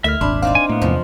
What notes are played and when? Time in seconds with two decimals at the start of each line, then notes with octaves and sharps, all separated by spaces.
0.04 D2 A3 E4 E5 F6 B6
0.21 D#1 G#1 D4 B5 C6
0.42 C4 D#4 D5 F5
0.55 G#5
0.69 A2 A#3 B3
0.82 E2 C3 F3